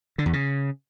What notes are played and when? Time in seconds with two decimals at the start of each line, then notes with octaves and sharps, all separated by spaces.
0.18 D3
0.26 E2
0.33 C#3